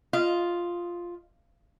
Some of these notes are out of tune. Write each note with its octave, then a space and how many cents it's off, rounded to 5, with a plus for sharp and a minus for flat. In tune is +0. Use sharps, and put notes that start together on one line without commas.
F4 +0 D#5 +15